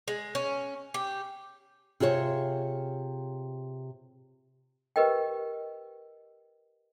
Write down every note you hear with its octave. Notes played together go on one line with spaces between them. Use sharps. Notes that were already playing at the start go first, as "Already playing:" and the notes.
G#3
C#4
G4
C3 F4 G#4 C5 C#5
G4 A#4 B4 D#5 G5